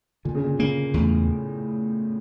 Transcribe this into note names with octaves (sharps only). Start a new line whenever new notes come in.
A#2 D3
C#3
A#2
C#3 A#3
E2 A2